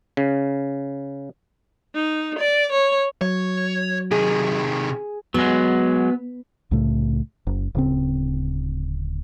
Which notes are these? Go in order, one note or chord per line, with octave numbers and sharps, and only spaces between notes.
C#3
D#4
D5
C#5
F#3 C#5
C3 D#3 G#4
F#3 G#3 B3
C2 A2 C#3 A3
F#1
D1 C#3 C4